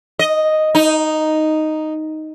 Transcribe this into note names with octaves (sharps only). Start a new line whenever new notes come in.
D#5
D#4